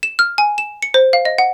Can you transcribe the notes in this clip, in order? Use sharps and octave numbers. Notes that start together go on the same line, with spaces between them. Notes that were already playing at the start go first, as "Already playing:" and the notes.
E7
F6
G#5
E7
C#7
C5
F5
D#5
F#5